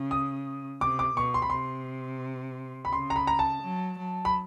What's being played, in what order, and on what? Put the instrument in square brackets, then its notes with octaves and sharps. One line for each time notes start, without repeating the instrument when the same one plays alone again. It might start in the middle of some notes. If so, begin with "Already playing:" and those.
Already playing: [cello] C#3
[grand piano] D#6
[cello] C3 [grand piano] D6
[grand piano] D6
[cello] B2 [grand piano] C#6
[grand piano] C6
B5
[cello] C3 [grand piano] C6
[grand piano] B5
[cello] C#3 [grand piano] C6
[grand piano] A#5
B5
A#5
A5
[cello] F#3
F#3
[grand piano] B5